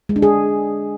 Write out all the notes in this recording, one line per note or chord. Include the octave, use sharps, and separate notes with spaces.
G#3
D4
G#4